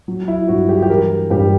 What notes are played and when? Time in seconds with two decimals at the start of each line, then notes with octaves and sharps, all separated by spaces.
0.08 F#3
0.28 E4
0.48 G2 F#4
0.69 G4
0.82 G4
0.89 E3 A#4
1.30 G2 G4